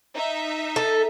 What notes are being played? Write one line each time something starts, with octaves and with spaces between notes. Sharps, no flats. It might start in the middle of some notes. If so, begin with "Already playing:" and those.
D#4 E5
A4